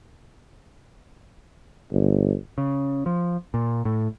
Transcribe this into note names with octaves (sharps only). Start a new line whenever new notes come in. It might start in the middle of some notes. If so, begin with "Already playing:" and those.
G1
C#3
F3
A#2
A2